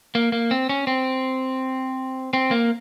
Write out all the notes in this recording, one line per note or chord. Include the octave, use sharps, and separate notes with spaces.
A#3
A#3
C4
C#4
C4
C4
A#3